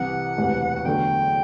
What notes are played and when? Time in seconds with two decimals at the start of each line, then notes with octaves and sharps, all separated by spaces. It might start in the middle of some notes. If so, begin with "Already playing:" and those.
Already playing: C2 C3 E3 F#5
0.37 E1 D2 C3 E3 B3
0.76 F#5
0.85 E2 D3 F#3 A3 G5